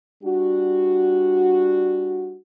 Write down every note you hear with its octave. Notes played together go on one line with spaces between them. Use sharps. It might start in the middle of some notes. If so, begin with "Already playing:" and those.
G3 D4 F#4